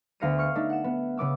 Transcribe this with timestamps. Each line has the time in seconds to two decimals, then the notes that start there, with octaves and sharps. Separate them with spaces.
0.20 D2 B3 F5 A#6 C#7 D#7
0.38 C#6 F6 C#7
0.55 A3 D4 D#4
0.70 F#5 E7
0.84 B3
1.17 C#3 B3 D6 E6